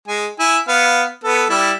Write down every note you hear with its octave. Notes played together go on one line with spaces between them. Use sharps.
G#3 G#5
E4 G#5
B3 F5
B3 A4 B4
G3 E4